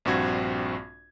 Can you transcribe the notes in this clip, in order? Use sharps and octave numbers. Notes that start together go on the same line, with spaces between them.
A#1 G2 C4 F#4 C#6 G#6